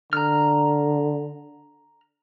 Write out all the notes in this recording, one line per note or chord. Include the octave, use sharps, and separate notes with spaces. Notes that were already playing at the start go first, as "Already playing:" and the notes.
D3 A#5 F6